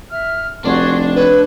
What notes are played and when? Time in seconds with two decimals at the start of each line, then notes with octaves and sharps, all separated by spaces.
0.11 E5 F6
0.65 F1 D4 F#4 G#4 C6
1.16 B4 C#5